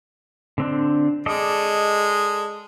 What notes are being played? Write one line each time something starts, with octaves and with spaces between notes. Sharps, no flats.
D3 C4 D4
G#3 A4 D5 D#5